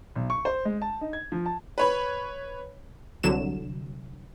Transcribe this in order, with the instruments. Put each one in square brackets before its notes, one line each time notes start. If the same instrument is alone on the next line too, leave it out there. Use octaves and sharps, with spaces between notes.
[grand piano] B1
C#6
C5
G#3
A5
D#4
G#6
F3
A5
[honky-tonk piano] B4 C#5 B5
[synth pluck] C2 D3 F#3 E7